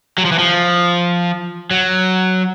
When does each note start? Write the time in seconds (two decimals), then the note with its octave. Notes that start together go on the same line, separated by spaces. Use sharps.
0.18 F#3
0.25 F3
0.32 E3
0.39 F3
1.71 F#3